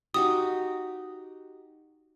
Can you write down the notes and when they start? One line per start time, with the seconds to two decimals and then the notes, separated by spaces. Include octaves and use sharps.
0.14 D#4 F#4 G4 D#6